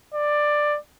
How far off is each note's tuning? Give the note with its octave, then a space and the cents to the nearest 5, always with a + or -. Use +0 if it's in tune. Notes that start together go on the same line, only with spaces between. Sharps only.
D5 +10